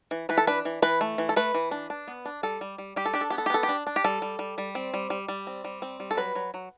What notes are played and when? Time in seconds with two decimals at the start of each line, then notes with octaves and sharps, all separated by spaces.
0.11 E3
0.29 E3 B4
0.38 A4
0.47 D4 B4
0.65 E3
0.82 E3 B4
1.01 A3
1.18 E3
1.29 A4
1.36 A3 B4
1.54 E3
1.71 D4
1.90 D4
2.07 B3
2.25 D4
2.43 G3 A4
2.61 G3
2.78 G3
2.96 G3 G4
3.05 A4
3.14 D4 G4
3.21 A4
3.30 B3 G4
3.38 A4
3.46 G4
3.50 B3 A4
3.63 G4
3.69 D4
3.87 D4
3.96 G4
4.04 G3 A4
4.22 G3
4.39 G3
4.58 G3
4.75 C4
4.94 G3
5.10 G3
5.28 G3
5.47 C4
5.64 G3
5.82 C4
6.00 G3
6.11 A4
6.17 F#3 B4
6.35 F#3
6.54 F#3